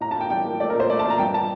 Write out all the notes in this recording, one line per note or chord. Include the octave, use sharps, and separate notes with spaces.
A2 A#5
A5
A2 G5
G3 G5
A#3
A3 D5
A#4
A#2
C5
A3 D5
A5
A#2
A#5
G2 G5
A5